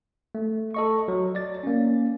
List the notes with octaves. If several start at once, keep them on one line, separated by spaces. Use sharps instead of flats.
A3
A4 D#5 C#6
F#3
D5 A6
A#3 C#4